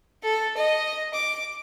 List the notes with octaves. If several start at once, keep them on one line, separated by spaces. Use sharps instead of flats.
A4
D#5
D6